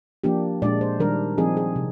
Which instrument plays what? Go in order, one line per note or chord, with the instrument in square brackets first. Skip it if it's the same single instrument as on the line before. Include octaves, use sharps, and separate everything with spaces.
[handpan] F3 A#3 D4 G4
A#2 G#3 D4 D5
C5
D#3 G3 D4 A#4
F3 C4 D#4 G#4
G#4
C3